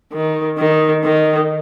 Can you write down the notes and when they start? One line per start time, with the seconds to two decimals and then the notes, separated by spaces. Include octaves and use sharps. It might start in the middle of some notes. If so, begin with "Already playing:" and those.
0.13 D#3
0.58 D#3
1.04 D#3